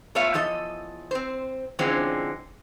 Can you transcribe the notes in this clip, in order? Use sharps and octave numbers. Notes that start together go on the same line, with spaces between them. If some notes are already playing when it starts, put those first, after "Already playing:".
A3 B3 F4 C#5 E5 F5
E2 F3 A4 D#5
C4 C5
D3 E3 F3 G#3 C4 C#4